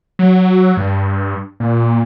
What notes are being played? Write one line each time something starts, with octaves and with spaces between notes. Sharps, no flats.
F#3
G2
A#2